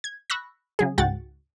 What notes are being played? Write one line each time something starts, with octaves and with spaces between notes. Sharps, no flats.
G#6
B5 C#6 E6 F#6 A#6
C#3 F#3 G#4
C#2 G#2 F#4 F#5 G5 A6